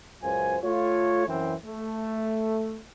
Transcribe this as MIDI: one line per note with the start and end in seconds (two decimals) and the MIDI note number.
0.22 0.57 37
0.22 0.57 42
0.22 0.57 65
0.22 0.57 72
0.22 0.57 80
0.63 1.24 57
0.63 1.24 65
0.63 1.24 73
1.27 1.54 42
1.27 1.54 52
1.27 1.54 60
1.65 2.79 57